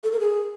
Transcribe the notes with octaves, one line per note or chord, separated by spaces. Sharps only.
A4
A#4
G#4